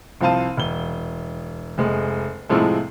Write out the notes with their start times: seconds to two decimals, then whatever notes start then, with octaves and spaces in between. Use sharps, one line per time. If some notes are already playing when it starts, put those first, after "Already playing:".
0.21 C2 F3 C4 F5 A5 D#7
0.57 E1 G7
1.78 F1 G#3
2.49 A2 C3 F3 G#3 A3